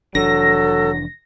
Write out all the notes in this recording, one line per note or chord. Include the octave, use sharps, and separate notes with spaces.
F1 E3 F#3 D4 A4 A#6